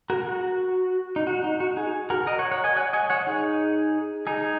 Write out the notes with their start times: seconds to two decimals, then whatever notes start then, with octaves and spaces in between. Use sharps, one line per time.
0.10 F#4 A#4
0.27 F#4
1.16 D#4
1.27 F#4
1.44 D#4
1.60 F#4
1.77 D#4 G#4
2.10 F#4 A#4
2.27 A#4 D#5
2.39 C#5 F#5
2.52 C#5 F#5
2.64 D#5 G#5
2.77 C#5 F#5
2.93 D#5 G#5
3.10 C#5 F#5
3.27 D#4 G#4
4.27 D#4 G#4